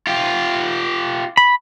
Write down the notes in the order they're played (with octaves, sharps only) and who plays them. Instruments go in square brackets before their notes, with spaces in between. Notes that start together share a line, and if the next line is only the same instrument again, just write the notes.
[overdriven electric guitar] F4 G4
[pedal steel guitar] B5